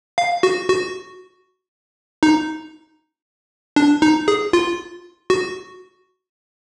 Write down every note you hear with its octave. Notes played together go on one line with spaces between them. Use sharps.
F5
F#4
F#4
D#4
D4
D#4
G#4
F4
F#4